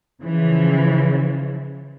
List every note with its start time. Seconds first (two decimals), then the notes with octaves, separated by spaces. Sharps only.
0.22 C#3 E3 F3